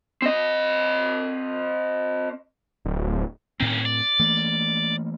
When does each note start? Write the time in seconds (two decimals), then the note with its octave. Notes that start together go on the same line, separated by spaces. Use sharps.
0.22 C4 D#5
2.85 D1
3.60 A2 D#3 C4 C#4
3.85 D5
4.19 E3 A3 A#3